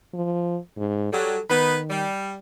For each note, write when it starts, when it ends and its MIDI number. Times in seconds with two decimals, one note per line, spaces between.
0.14 0.57 53
0.77 1.12 44
1.13 1.37 54
1.13 1.37 55
1.13 1.42 69
1.50 2.06 51
1.50 1.77 59
1.50 1.77 63
1.50 1.77 71
1.90 2.35 55